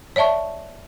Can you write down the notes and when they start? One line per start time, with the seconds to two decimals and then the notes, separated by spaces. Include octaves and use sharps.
0.16 C#5 D5 E5 A5 C#6